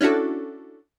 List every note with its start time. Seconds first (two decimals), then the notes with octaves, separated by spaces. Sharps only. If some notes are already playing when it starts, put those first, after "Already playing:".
0.01 C#4 D4 E4 F#4 A4